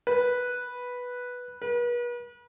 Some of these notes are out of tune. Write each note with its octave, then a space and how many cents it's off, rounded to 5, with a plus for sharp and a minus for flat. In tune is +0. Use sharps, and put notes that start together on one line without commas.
B4 -5
B4 -40